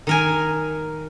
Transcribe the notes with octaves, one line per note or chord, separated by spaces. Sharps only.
D#3 A#4 G#5